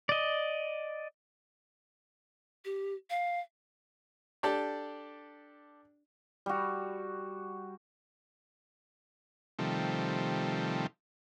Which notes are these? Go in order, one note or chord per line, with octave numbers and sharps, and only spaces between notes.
D5 D#5
G4
F5
D4 G4 A4 D5
G3 F#4
C3 D#3 F3 G3 A3